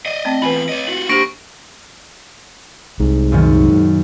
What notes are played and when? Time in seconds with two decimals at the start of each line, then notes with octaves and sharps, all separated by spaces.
0.06 D5 D#5
0.25 A3 C4 A5
0.42 E2 F4 B4 G#5 B5 F#7
0.69 C#5 D#5
0.87 F4 F#4 F#7
1.09 A#3 D4 G4 C5 C#6 A#6 D7
3.00 C2 G#2
3.32 F#2 A#2 D#3